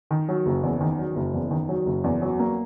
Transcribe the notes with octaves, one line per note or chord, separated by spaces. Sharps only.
D#3
F#3
F#1
E2
D#3
F#3
F#1
E2
D#3
F#3
F#1
E2
F#3
A#3